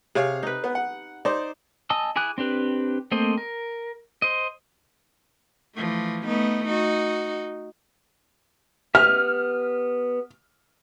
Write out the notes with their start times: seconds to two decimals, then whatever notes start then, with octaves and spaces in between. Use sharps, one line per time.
0.15 C3 G#4 C#5 F5
0.43 D#4 B4
0.64 B3
0.75 F#5
1.25 D#4 C5 D5
1.90 D#5 G#5 A5 D#6 E6
2.16 E4 G#4 G#5 D6 F#6
2.38 C4 D4 G4 B4
3.11 A3 A#3 C4 C5 D#5
3.38 A#4
4.22 C5 D#5
5.75 E3 F3 A3
6.25 A3 B3 D#4
6.66 D#4 F#4
8.95 B3 G4 E5 F6